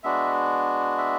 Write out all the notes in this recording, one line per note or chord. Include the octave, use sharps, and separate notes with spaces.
G#3 B3 D4 F#4 E5
E5